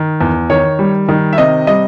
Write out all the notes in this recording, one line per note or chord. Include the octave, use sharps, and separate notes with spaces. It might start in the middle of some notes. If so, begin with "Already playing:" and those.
Already playing: D#3
E2
D#3 C#5
G3
D#3
E5
C3 D#5
G3 D#5